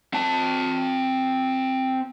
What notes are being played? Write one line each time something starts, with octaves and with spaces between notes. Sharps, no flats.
C4 A5